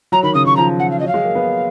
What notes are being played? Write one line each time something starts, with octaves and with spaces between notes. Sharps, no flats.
F#3 A#5
D#3 B5
C#3 D#6
D#3 C#6
F3 A#5
F#5
F5
F#3 D#5
F5
G#3
A#3
B3